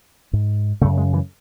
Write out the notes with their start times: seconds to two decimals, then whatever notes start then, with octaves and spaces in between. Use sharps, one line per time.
0.33 G#2
0.81 C#3 A3
0.84 F#2
0.97 G#3
1.13 E3